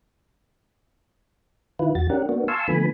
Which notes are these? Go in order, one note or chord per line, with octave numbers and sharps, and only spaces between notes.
D#3 E4 F4 B4
E2 F#4 A6
C#4 D4 G4 A#4 F#5
A#3 B3 D4 F#4
F5 G#5 A5 C6 C#6 E6
D3 F3 A3 B3 G#5 B5